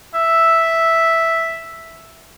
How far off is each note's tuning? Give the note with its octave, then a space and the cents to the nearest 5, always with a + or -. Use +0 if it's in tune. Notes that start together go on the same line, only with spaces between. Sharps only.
E5 +0